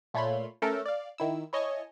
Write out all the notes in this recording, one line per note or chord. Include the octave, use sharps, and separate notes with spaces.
A#2 A3 F4 C#5 B5 C6
A3 C#4 A4 A#4
D5 F5
D#3 E4 E6
E4 C#5 D#5 G#5 A5 C#6